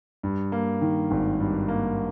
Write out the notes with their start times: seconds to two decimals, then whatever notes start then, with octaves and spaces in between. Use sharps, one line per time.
0.23 G2
0.52 A#3
0.82 D#3
1.11 G#1
1.40 G2
1.68 A#3